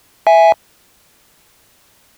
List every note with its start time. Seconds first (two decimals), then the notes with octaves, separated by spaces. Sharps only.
0.27 E5 G#5